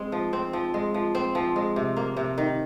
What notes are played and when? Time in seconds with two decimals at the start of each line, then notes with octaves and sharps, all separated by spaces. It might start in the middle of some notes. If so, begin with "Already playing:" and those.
Already playing: G#3 C4
0.12 F3
0.33 C4
0.53 F3
0.74 G#3
0.94 F3
1.15 C4
1.35 F3
1.56 G#3
1.76 C3
1.96 A#3
2.17 C3
2.38 D#3